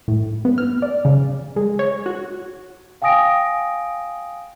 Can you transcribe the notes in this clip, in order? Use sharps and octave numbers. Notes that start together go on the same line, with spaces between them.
A2
B3
F6
D5
C#3
G#3
C#5
F#4
F5 G5 G#5 D#6 A#6 D7